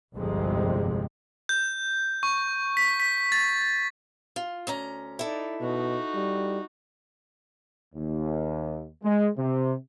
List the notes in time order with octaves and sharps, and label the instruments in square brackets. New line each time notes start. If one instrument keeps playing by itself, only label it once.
[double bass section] G1 C2 F2 C3 G#3
[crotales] G6
C#6
B6
B6
A6
[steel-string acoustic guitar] F4
D2 C#4 A#5
[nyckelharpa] D#4 D5 [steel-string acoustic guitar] E4 A4
[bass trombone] B2 [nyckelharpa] D#4 F#4
[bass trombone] G3
[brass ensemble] D#2
G#3
C3